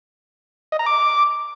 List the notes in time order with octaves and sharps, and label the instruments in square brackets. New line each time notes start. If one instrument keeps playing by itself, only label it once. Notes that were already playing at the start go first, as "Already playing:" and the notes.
[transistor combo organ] D#5
A#5
D6